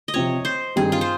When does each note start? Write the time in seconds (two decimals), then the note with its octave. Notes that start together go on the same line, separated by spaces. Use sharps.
0.08 D#5
0.14 C3 F3 C4 F4 C#5
0.45 C5
0.76 G2 D#3 G3 C4 G#4
0.92 F4
1.01 C5